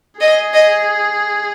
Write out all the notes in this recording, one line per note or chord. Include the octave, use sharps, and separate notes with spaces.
G#4 D#5
D#5